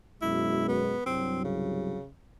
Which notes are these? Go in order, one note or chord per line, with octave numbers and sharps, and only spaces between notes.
F#2 B2 G#3 E4
B3
C2 G2 F#3 C4
C#3